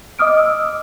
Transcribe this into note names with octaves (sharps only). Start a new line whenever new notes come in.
D#5 D6 D#6 F6 D7
E6